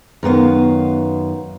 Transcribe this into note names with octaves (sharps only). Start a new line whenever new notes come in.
F#2 D#3 B3 F5